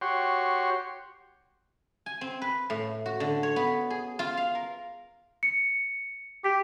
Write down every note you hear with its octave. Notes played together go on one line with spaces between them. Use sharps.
F#4 G4 C#5 C6
G#5
C4
B4
A2
F#4
D3
C#5
B3
G#4
F4
F5
A#4
C#7
G4 B6